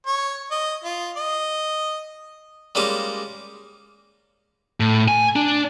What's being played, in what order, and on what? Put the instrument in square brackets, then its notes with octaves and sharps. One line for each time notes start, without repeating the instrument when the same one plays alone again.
[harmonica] C#5
D#5
F4
D#5
[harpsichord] G3 G#3 A#3 C#4 F4 G4
[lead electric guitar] A2
G#5
D4